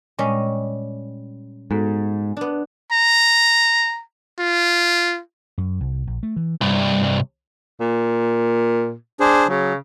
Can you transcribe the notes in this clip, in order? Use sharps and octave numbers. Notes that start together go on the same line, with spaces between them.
A#2 G3 G#3 C#4 D#5
G#2 B3 F#4 A4
B3 D4
A#5
F4
F#2
C2
A#1
A3
E3
C2 G2
A#2
D4 G#4 C5
C#3 F#3